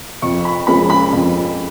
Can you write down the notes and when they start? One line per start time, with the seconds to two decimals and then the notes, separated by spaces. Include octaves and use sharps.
0.22 F2 C#6
0.45 B5
0.67 F3 G#3 C#4 B5
0.90 B5
1.13 F2